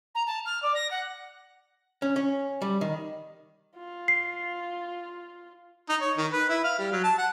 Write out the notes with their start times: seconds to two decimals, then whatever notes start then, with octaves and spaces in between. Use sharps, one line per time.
0.14 A#5
0.26 A5
0.45 F6
0.62 D5
0.75 A#6
0.90 F#5
2.02 C#4
2.16 C#4
2.62 G3
2.81 D#3
3.76 F4
4.08 C7
5.89 D#4
6.01 C#5
6.18 D#3
6.32 B4
6.49 E4
6.64 F5
6.79 G3
6.92 F#3
7.04 A5
7.18 F#5